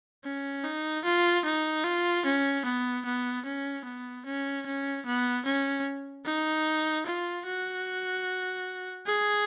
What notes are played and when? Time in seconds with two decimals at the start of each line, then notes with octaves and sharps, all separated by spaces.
0.25 C#4
0.64 D#4
1.04 F4
1.45 D#4
1.84 F4
2.25 C#4
2.65 B3
3.05 B3
3.45 C#4
3.85 B3
4.26 C#4
4.66 C#4
5.06 B3
5.46 C#4
6.26 D#4
7.06 F4
7.46 F#4
9.06 G#4